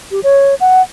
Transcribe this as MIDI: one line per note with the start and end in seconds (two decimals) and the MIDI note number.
0.11 0.20 67
0.23 0.55 73
0.60 0.82 78